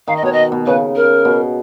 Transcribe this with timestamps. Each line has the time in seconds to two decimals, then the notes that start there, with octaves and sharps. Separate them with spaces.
0.08 D#3 F5
0.16 D#5
0.23 B2 C#5
0.32 D#5
0.52 B2
0.66 C#3 B4
0.96 A#4
1.25 B2